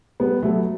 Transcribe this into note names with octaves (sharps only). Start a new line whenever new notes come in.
G3 B3
F#3 A3